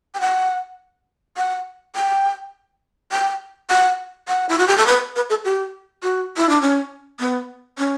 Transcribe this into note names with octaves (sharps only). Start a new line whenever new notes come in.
G5
F#5
F#5
G5
G5
F#5
F#5
E4
F#4
G4
A4
B4
B4
A4
G4
F#4
E4
D4
C#4
B3
C#4